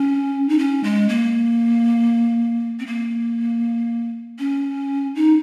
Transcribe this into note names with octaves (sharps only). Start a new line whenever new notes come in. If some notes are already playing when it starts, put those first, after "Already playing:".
Already playing: C#4
D#4
C#4
G#3
A#3
C4
A#3
C#4
D#4